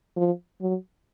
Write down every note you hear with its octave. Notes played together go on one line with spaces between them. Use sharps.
F3
F#3